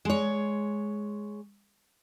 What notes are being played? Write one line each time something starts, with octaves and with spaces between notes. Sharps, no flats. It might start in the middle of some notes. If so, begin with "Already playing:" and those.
G#3 C#5